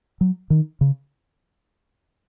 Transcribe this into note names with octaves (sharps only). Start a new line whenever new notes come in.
F#3
D#3
C#3